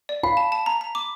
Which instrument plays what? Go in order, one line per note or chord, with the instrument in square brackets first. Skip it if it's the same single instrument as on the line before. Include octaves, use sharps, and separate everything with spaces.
[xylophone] D5
[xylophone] F5 [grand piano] B5
[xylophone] A5
A5
A#5
A#5
D6